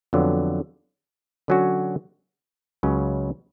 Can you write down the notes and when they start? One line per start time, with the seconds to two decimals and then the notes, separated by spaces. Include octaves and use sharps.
0.13 F2 D3 F#3 B3
1.48 D3 F#3 C#4 F#4
2.83 C#2 C#3 F#3 C#4